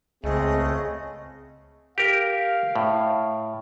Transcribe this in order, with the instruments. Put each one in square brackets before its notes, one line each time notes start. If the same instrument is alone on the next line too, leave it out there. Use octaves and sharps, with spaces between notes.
[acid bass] C#2 [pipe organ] C#3 A3 [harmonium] C4 G#4 [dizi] D#5
[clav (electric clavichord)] G4 A#4 [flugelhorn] F5
[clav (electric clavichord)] A2